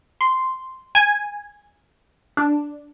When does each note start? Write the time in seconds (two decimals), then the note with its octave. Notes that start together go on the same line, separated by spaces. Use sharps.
0.21 C6
0.95 G#5
2.37 D4